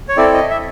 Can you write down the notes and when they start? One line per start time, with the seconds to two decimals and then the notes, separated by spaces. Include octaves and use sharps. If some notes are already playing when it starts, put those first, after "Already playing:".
0.09 C#5
0.17 C4 E4 A4 D5
0.34 D#5
0.50 E5